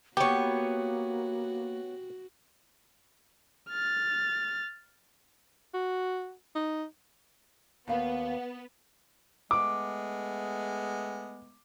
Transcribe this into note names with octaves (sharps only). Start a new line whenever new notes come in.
A#3 B3 F#4 G4 C#5
F6 A6
F#4
D#4
D#2 B3 F5
G#3 A3 B3 D6